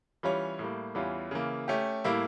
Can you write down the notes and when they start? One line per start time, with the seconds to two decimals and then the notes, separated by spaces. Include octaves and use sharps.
0.23 E3 G3 C#4 F4 C#5
0.59 A2 G3 A#3
0.95 E2 E3 G3 C#4 F4
1.31 C#3 E3 A#3
1.68 A3 C#4 G4
2.04 A2 G3 A#3 E4